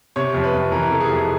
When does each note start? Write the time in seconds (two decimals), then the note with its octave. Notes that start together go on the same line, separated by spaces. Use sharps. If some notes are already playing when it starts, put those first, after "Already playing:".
0.16 C3 C#5
0.34 F2
0.44 B4
0.53 F2
0.72 E3 A#4
0.91 C3 A4
1.01 G#4
1.10 F2